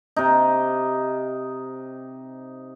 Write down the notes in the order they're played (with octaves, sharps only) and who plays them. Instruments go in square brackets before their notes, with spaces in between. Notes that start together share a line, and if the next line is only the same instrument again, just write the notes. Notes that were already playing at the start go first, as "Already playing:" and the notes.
[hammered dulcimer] C3 D#4